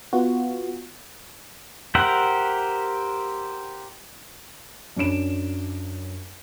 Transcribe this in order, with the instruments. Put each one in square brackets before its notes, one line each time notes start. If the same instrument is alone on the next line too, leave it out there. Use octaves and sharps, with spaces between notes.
[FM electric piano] B3 F4 F#4
[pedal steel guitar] G4 A#4 C5 E5 F#5
[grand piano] F#2 D4 C#5 D7 E7